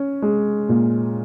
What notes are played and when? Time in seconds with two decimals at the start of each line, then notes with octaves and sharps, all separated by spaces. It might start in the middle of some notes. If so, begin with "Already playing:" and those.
Already playing: C#4
0.22 G#3
0.69 A#2